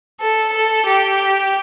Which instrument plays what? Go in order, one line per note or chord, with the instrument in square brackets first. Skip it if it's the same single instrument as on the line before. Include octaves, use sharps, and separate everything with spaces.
[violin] A4
A4
G4